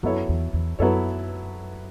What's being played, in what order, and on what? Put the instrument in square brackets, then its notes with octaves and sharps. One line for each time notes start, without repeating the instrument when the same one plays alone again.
[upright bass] F#2 [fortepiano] F#3 B3 E4 A4 C#5
[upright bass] E2
E2
[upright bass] F#2 [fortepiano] F#3 B3 E4 A4 C#5